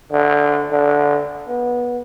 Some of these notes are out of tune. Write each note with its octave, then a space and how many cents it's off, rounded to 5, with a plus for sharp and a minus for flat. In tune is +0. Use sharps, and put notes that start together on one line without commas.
D3 -5
D3 -10
B3 -20